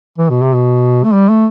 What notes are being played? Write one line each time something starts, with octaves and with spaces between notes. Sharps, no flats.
E3
B2
C3
B2
A3
G3
A3